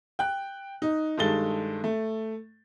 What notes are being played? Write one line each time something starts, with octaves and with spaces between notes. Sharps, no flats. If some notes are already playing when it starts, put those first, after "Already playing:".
G5 F#6
D#4
G2 D#3 G#3 A4 A6 G7
A3